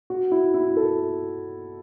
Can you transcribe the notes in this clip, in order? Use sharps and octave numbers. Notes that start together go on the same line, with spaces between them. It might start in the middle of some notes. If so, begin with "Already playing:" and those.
F#4
E4
E4
A4